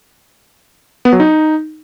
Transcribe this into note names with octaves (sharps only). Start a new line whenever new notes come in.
B3
F#3
D#4